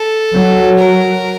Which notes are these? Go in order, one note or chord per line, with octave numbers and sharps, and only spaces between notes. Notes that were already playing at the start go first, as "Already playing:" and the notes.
Already playing: A4
F#3
A#4